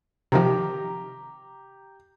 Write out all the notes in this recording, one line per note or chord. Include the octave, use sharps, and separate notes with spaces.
C3 D#3 F3 G4 A#5